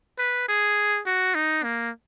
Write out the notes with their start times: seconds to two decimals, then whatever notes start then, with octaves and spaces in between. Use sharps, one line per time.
0.19 B4
0.48 G#4
1.06 F#4
1.35 D#4
1.64 A#3